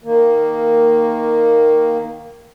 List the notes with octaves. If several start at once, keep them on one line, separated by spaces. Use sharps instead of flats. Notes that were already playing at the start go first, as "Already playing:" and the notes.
D#3 A#3